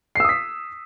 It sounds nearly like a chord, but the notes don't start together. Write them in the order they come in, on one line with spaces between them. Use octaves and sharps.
C7 E6 D#6 B6